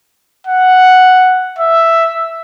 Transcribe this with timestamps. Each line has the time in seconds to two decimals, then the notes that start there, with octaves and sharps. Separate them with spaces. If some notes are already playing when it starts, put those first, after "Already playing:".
0.47 F#5
1.59 E5